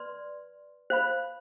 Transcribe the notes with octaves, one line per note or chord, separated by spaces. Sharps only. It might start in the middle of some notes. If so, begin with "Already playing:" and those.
Already playing: B4 D5 C6
C5 F5 B5